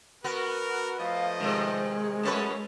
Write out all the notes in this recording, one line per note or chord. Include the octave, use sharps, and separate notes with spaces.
B3 F#4 A#4
F3 A3 D#5 F5
C3 D#3 G#3
F#2 A3 C#4 G#4 B4 A5